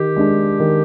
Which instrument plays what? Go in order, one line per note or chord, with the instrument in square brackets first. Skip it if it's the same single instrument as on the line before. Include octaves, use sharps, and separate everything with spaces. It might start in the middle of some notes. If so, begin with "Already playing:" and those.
Already playing: [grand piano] D#3 [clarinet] G4
[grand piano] G#3 D4
D#3